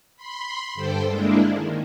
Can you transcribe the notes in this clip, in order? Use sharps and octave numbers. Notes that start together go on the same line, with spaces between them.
B5 C6
G2 D3 A4 C5 G5
G#3 A#3 D4 E4
D#3